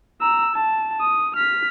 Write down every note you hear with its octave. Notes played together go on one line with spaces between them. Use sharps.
A#5 E6
A5
D#6
F6 B6